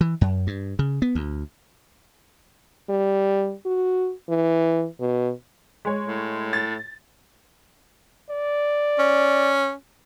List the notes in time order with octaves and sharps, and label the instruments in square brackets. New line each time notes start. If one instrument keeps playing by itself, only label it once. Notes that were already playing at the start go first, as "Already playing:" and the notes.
[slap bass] E3
F#2
G2
C#3
B3
D2
[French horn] G3
F#4
E3
B2
[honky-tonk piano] G#3 C#5
[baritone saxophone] A2
[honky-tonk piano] A6
[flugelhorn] D5
[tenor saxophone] C#4